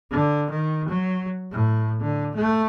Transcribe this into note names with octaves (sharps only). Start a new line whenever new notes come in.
D3
D#3
F#3
A2
D3
A3